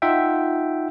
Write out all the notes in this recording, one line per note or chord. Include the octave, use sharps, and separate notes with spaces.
D#4 F4 E5 F#5 G5